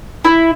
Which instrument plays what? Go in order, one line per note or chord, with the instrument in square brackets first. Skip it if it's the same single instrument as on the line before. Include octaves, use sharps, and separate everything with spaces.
[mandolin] E4